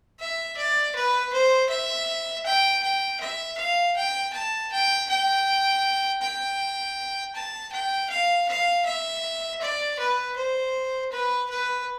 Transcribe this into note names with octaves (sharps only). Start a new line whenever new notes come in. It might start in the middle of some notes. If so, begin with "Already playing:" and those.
E5
D5
B4
C5
E5
G5
G5
E5
F5
G5
A5
G5
G5
G5
A5
G5
F5
F5
E5
D5
B4
C5
B4
B4